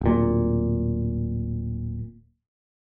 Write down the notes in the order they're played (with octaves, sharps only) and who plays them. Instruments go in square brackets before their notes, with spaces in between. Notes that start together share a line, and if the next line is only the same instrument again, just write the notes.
[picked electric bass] D1 A#2